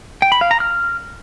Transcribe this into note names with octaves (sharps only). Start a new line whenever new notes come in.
G5
B5
F5
A#5
F6